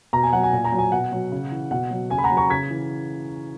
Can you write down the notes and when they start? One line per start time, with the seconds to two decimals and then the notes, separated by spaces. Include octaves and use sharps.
0.13 B2 A#5
0.23 G#5
0.33 F#3 F#5
0.43 G#5
0.53 A#2
0.64 A#5
0.72 F#3
0.78 G#5
0.92 B2 F#5
1.12 F#3
1.32 C#3
1.51 E3
1.71 B2 F#5
1.91 F#3
2.10 C#3 G#5
2.18 B5
2.24 F#5 A#5
2.30 F#3
2.37 A#5 C#6
2.50 C#3 G#6 B6
2.70 E3